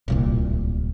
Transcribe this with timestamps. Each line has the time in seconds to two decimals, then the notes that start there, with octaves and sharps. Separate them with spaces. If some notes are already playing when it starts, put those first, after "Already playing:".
0.08 D1 C2 A#2